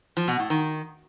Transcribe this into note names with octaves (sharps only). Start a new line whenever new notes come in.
F3
B2
A2
D#3